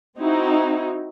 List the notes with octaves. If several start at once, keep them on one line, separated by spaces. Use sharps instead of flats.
C4 D#4 E4 F#4